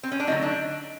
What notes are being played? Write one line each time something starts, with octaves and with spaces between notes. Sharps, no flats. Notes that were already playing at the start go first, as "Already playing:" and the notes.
C4
C#4
D4
D3 F#3 A3 D#4
D4